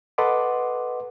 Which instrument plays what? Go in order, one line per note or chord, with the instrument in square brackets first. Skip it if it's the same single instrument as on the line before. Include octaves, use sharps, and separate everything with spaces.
[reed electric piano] A4 B4 D#5 F#5 C6 D6